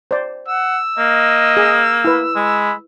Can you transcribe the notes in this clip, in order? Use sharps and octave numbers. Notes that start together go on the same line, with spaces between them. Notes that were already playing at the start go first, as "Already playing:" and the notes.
C5 D5
F#5 E6
A#3 D#5
G#4
E4 B4
G#3 B5